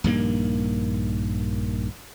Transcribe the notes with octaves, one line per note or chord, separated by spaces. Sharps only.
A#1 G2 D#3 A#3